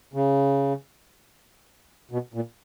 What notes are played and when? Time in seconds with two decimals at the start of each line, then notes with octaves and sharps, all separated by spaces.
0.14 C#3
2.11 B2
2.34 A#2